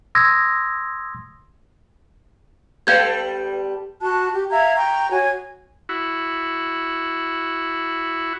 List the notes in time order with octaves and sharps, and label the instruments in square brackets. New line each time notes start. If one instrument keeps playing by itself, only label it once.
[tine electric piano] C6 D#6 E6 G#6 A#6
[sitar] G3 B3 A4 [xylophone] F5 G6 G#6
[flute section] F#4 A5 F#6
G4
E5 F5 A#5 G#6
G5 A#5 C#6
F#4 C#5 G#5
[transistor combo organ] E4 F#4